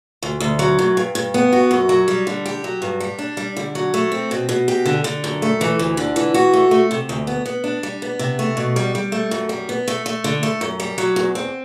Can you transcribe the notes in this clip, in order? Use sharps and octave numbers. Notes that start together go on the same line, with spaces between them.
D2
D2
F#3
F#2
G2
G2
B3
F#4
F#2
F#3
G3
D3
G4
F#3
G2
G3
D4
G3
D3
F#3
A3
C4
B2
B2
G4
D3
D3
F#2
A3
E3
D2
D3
E3
F#4
A3
A3
C3
D2
B3
B3
D4
G3
B3
C3
A3
B2
G3
G3
A3
F#2
G3
B3
A3
A3
D3
A3
F#2
G3
F#3
E2
C4